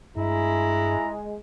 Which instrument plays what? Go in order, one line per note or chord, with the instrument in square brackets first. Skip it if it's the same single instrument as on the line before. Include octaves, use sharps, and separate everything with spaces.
[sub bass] G2 [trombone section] G#3 [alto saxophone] E4 [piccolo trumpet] A#5